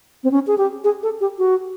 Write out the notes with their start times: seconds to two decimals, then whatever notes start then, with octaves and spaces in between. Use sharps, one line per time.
0.24 C4
0.31 C#4
0.47 G#4
0.58 G4
0.84 G#4
1.03 A4
1.21 G4
1.38 F#4